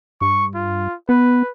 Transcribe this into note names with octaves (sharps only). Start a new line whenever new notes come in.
G2 C#6
F4
B3 B4